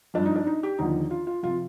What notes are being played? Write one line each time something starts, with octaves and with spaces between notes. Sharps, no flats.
G2 F3 D4
D#4
D4
D#4
G4
D#2 D3 F3 D#4
F4
F4
C3 F3 F4